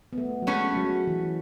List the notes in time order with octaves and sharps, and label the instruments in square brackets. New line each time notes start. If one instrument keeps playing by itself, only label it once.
[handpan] B3
A3
F#3
[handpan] G#3 [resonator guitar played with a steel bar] A3 C#4 F#4 B4
[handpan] G#3
F#3
E3